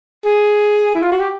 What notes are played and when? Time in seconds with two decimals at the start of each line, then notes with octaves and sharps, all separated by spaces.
0.25 G#4
0.95 E4
1.02 F4
1.12 F#4
1.20 G4